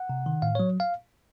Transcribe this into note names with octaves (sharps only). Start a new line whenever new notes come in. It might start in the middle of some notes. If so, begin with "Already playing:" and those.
Already playing: F#5
C3
D#3
A2 F5
F#3 C#5
F5